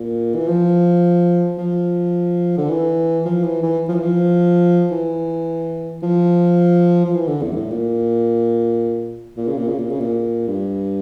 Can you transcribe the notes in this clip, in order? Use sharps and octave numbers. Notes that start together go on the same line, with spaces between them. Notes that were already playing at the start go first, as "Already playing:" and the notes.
Already playing: A#2
E3
F3
F3
D3
E3
F3
E3
E3
F3
E3
F3
E3
F3
F3
E3
D3
E2
G2
A2
A#2
A#2
C#3
A#2
C#3
A#2
C#3
A#2
G2